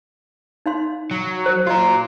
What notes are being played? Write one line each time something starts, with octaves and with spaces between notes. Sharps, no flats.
D#4 F5 C6
F#3
C5
F4 F#4 A#4 D#5